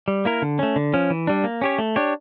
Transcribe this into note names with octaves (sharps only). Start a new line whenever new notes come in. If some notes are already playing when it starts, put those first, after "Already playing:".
G3
A#3 E4 A#4
D3
A3 C#4
D3
F3 C#4
E3
G3 D4
A#3
C#4 G4 C#5
A3
D4 G4 C#5